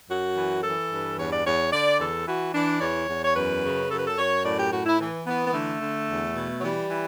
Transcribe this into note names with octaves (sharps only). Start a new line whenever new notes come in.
F#2 F#4
E3
E3 A4
G2
E2 C#5
D5
E2 C#5
D3 D5
E2 A4
E3 F#4
E3 D4
D5
E2 C#5
E2
C#5
F#2 B4
C#3
F#2 A4
B4
A4
F#2 C#5
A2 D5
G4
A2 F#4
E4
E3
E3 B3
B3
D3 A3
D3
E2
B2
F#3
E3 G3
E3